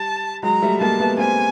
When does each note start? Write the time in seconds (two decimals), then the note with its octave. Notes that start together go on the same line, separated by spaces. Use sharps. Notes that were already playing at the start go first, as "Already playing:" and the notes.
Already playing: G3 A5
0.43 F#3 G#3 A#5
0.62 G3 A3
0.81 G#3 A#3 A5
1.00 A3 B3
1.18 A#3 C4 G#5